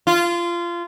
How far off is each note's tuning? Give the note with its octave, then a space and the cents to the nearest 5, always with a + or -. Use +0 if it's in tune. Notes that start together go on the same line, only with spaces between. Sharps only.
F4 -20